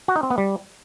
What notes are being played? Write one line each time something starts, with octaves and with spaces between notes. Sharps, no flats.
F#4
D#4
C4
B3
G3